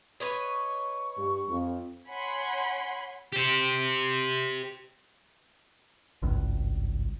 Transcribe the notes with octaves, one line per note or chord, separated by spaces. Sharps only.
B4 C#5 D#5 C#6
G2
F2
C#5 F#5 G#5 B5 C6
G4 C5
G#1 C#2 G2